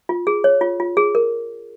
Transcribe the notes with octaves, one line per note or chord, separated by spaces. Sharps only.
F4
G#4
C#5
F4
F4
G#4
A#4